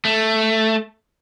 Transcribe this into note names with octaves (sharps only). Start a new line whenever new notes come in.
A3